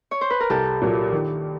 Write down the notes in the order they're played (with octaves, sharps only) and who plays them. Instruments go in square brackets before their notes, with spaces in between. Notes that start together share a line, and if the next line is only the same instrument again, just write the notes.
[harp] C#5
C5
B4
A#4
[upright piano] C2 [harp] G4 A4
[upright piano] A#2 F#3 A#3
D#3